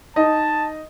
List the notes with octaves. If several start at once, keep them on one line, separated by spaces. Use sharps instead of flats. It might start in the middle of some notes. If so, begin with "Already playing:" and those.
D#4 D#5 A5